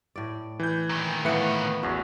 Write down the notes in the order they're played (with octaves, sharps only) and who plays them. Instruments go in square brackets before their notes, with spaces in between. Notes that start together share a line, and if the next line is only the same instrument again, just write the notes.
[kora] A2 D5
[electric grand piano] E3 G6
[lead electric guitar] A#2 D#3
[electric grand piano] A2 B4 C#7 [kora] E3 A#3 B3
[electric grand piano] A1 E2 [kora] F#4